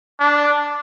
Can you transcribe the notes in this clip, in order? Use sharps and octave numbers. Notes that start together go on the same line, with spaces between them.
D4